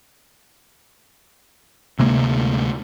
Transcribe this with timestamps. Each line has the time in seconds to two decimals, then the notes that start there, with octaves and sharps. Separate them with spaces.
1.99 D2 C3 G#3 A#3